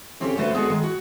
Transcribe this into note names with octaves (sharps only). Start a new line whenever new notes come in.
C#3 C4 C#4 G4 A4
D3 A3 F#4 B4 C5
G#3 B3 D4 F#4 G#4 A4
D#3 G#3
F#4